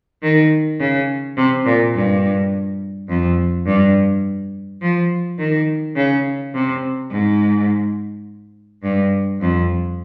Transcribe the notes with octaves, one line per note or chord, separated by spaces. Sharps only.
D#3
C#3
C3
A#2
G2
F2
G2
F3
D#3
C#3
C3
G#2
G2
F2